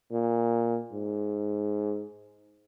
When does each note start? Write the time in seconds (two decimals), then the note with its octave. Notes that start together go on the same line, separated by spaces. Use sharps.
0.12 A#2
0.93 G#2